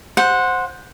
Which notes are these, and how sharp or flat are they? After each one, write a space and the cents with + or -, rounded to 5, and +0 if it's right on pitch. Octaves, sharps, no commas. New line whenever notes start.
C5 +0 F#5 -15